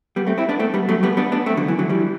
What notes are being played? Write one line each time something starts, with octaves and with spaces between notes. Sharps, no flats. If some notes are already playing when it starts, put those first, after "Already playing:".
G3 B3
A3 C4
C4 E4
B3 D4
A3 C4
G3 B3
F#3 A3
G3 B3
B3 D4
B3 D4
A3 C4
D3 F#3
E3
D3 F#3
E3 G3